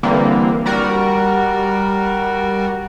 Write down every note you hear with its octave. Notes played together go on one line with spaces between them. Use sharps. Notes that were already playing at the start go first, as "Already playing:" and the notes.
D3 E3 G3 A#3 C4
G3 F#4 A#4